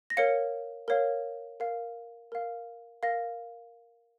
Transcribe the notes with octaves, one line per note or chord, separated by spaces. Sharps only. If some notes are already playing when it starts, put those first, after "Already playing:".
A#6
A#4 C#5 F5 C#7
A#4 C#5 F5
A#4 F5
A#4 F5
A#4 F5 A#6